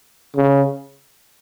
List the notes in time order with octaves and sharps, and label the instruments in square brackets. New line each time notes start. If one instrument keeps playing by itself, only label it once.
[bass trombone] C#3